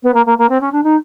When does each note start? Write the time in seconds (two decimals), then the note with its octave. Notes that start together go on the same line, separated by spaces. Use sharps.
0.03 B3
0.14 A#3
0.26 A#3
0.38 A#3
0.49 C4
0.61 C#4
0.72 D4
0.83 D#4